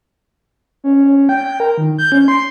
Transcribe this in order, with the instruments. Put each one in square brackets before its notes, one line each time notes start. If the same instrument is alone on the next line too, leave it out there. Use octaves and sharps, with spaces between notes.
[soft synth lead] C#4
C#4
G5
G5
A#4
D#3
G6
C#4
C6